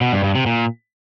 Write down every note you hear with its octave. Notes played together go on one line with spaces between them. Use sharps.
B2
G2
G2
C3
A#2